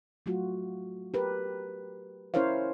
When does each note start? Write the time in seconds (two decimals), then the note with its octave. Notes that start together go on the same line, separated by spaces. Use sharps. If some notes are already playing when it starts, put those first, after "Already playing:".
0.26 F#3 A3 F4 F#4
1.14 G4 A#4 B4
2.34 C#4 E4 A#4 C5 C#5 F5